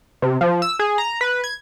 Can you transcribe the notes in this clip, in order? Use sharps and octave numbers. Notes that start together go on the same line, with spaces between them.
C3
F3
E6
G#4
A#5
B4
G#6